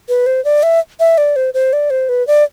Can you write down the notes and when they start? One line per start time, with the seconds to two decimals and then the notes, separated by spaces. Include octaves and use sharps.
0.09 B4
0.26 C5
0.45 D5
0.63 E5
1.00 E5
1.18 D5
1.36 C5
1.54 C5
1.73 D5
1.90 C5
2.09 B4
2.27 D5